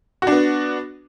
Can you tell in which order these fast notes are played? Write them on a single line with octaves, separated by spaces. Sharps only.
F#4 D4 B3